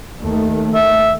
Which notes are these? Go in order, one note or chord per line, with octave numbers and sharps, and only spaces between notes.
D#2 D#3 A3
E5